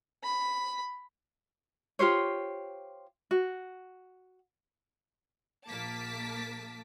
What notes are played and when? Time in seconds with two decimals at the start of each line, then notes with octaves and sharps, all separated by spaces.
0.24 B5
1.99 F4 G4 C5 C#5
3.31 F#4
5.68 A#1 A#3 A5 D6 B6